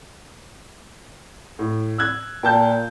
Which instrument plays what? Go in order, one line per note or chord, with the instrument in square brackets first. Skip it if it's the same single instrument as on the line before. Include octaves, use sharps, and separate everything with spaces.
[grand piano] A2
E6 F#6 G#6
[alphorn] A#2 [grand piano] G5 A5 G6